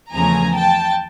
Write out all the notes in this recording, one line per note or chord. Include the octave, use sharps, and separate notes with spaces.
E2 C#3 F3 A3 G#5 A#5
G5 A5